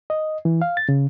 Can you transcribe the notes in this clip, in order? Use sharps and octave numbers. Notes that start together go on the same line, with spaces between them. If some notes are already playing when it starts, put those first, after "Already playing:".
D#5
E3
F5
A6
C#3